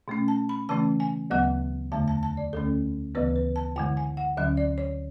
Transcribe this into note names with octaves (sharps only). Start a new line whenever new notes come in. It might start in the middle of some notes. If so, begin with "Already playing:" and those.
B2 A3 C#4
A5
B5
C#3 E3 A3 C#4 A5
G#5
D2 C#3 F#3 B3 F#5
E2 D3 A3 A5
A5
A5
D5
D2 D3 A3 C#4 A4
D2 C#3 E3 B3 B4
B4
A5
F#2 D3 G#3 G#5
G#5
F#5
D2 D3 F#3 C#4 E5
D5
C#5